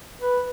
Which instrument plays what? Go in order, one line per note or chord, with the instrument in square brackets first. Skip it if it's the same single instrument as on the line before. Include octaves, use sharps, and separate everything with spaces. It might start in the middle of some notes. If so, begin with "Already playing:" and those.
[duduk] B4